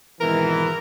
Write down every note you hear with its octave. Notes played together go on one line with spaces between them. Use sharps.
G#1 B2 E3 A#4